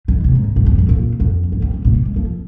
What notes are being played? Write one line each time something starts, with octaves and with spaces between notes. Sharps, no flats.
D#3
C3
G#2
G#2
F2
G#2
A#2
F2
G#2
F2
G#2
A#2
C3
G#3
F3